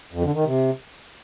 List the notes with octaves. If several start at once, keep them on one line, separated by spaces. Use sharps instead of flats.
F2
D3
D#3
C3